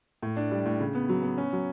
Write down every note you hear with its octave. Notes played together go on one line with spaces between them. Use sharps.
A2
D4
G3
A2
C#3
B3
F#3
B3
C#4
F#3